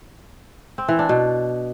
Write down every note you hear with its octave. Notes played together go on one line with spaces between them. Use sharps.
C4
E3
D4
B2